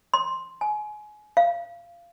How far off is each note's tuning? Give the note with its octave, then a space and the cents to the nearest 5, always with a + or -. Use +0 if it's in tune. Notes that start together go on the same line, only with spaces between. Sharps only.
C6 +5
G#5 +25
F5 -20